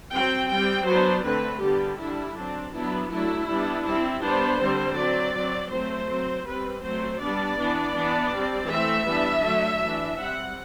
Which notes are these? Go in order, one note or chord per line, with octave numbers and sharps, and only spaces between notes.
F#3 C4 G5
G3 C4 G5
F#3 B3 D4 C5
D3 A3 C4 B4
D3 G3 B3 G4
D3 G3 D4 E4
F#3 C4 D4
F#3 B3 D4 E4
F#3 A3 D4 E4
G3 B3 D4
G3 C4 E4
G3 B3 D4 C5
D3 G3 C4
F#3 C4 D5
F#3
C4
F#3 A3 C4 C5
F#3 C4
G3 C4 B4
F#3 A3 C4 C5
G3 B3 D4 D5
E3 B3 D4
E3 B3 D4
G3 C4
E3 A3 C4 E5
E3 G3 B3 D4
D3 F#3 A3
E3 A3 D4
G3 C4 F#5